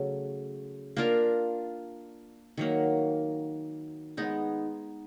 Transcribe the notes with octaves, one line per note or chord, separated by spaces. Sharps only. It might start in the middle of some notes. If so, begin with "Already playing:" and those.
Already playing: C#3 F#3 A3
A#3 D4 F4 A#4
D#3 F#3 A#3
G#3 B3 D#4